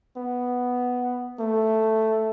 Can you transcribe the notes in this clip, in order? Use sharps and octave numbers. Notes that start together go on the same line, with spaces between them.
B3
A3